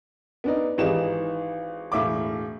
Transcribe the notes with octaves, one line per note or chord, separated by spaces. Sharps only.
B3 D4 D#4
G#1 E3 D#4 G4 G#4 E7
E1 A2 E5 F5 D6